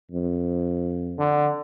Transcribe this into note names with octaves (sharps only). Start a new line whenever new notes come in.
F2
D3